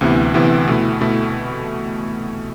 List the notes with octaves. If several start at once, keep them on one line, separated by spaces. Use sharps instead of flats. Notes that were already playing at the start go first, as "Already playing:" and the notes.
D2 C3 E3 B3 E4
D2 C3 E3 B3 E4
B2 A3 E4
B2 A3 E4